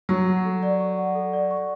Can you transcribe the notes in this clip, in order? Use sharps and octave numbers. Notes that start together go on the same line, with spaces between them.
F#3 C#6
F#5
A4
D5
C#6
F#5
A4
D5
C#6